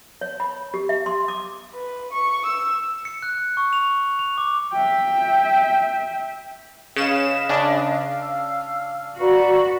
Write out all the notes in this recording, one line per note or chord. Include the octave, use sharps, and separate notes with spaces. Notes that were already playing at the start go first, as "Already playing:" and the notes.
C#5
B5
G4
E5
C6
D6
B4
C#6
E6
C#7
F#6
F#6
C#6
F7
F7
D6
E5 G5
C#3 B4 D#5 F5 E7
C#3 D4 F5
E6
F#4 B4 D5 A#5 C#6